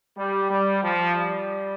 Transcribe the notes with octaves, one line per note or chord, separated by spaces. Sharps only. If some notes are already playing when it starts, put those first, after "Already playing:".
G3
G3
F3
G3